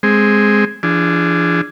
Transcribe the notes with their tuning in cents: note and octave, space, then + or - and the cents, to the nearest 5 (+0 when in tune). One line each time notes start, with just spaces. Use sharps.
G#3 +0 C4 +0
F3 -45 D4 +0 G#4 +0